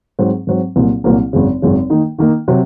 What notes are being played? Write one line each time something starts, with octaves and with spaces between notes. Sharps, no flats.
G#2 F#3 C4
G#2 F#3 C4
C2 A#2 F#3 A#3
C2 A#2 F#3 A#3
G#1 F#2 C#3
G#1 F#2 C#3
D#3 A#3 D#4
D#3 A#3 D#4
C3 F#3